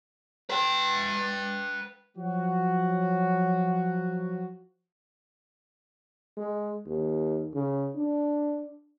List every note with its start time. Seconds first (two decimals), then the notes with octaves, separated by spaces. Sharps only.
0.50 B4 G5
2.17 F3 F#3 F#4
6.37 G#3
6.86 D#2
7.54 C#3
7.95 D4